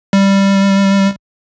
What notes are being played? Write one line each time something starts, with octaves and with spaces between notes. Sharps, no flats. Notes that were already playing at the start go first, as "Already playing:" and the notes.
G3